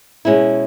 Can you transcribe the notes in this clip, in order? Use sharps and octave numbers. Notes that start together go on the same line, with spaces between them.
B2 G#3 C#4 E4